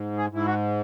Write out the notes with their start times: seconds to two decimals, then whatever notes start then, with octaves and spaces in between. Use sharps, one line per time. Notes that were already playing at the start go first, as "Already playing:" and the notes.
Already playing: G#2
0.17 G#4
0.32 G#2 E4
0.46 F#4